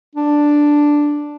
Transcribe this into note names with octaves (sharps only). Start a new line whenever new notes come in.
D4